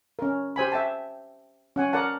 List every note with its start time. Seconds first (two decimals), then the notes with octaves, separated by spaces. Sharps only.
0.19 C#4 A#4
0.56 G4 C5 G#5 B5
0.72 E5 G5 A5
1.76 C#4 F#5 G#5
1.93 A#4 D5 F#5 A5